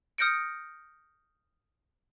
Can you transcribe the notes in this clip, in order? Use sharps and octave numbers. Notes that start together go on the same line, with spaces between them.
D#6 F6 G6 A#6 C#7 D7